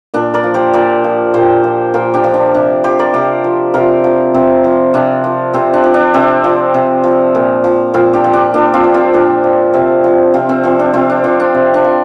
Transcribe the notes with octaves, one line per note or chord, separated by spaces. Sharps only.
A#2 D4
A#4 D5
F3
G4 C5
A#2 A#4 D5
F3
A#2 G4 C5
F3
A#2 F4 A#4
D4 G4
F3
D4
C3 D4
F3 G4 C5
A#4 D5
C3 G4 C5
F3
C3 F4 A#4
F3
C3 C4
F3
C3 D4
F3
C3 C4
D4
F3
D4
C3 C4
F3
C3
F3
A#2
F3
A#2 C4 F4
D4 G4
F3
D4 G4
A#2 D4
C4 F4
F3
C4 F4
A#2 D4
F3
C3 C4
F3
C3 C4 F4
C4
F3 C4
D4
C3 C4 F4
D4
F3 C4
D4
C3
D4
F3